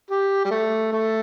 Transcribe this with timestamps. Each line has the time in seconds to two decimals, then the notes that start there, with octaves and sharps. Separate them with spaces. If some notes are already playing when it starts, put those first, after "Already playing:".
0.10 G4
0.45 G3
0.51 A3
0.93 A3